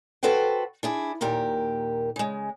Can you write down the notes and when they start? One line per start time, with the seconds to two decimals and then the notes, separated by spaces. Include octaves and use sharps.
0.23 F#4 A4 B4 C5 F#5 G5
0.83 D4 E4 G#4
1.21 D#2 A#2 G4 A#4
2.16 C#3 G#3